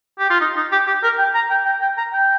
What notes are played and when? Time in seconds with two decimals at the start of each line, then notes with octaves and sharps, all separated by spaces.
0.19 G4
0.30 F4
0.40 D#4
0.57 D#4
0.72 G4
0.87 G4
1.03 A#4
1.18 G5
1.35 A#5
1.51 G5
1.66 G5
1.81 G5
1.97 A#5
2.13 G5